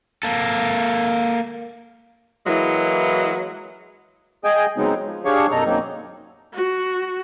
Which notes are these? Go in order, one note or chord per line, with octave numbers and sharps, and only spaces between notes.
A#3 A4
E3 F#3 G#3 A#3 E4
G#4 D#5 G5 G#5
C#3 F#3 G#3 B3 C4 D#4
F3
D4 G4 G#4 C#5 F5 C#6
F#2 B2 D#4 A4 A#5
F#2 D#3 F#3 A#3 C4 D#4
F#4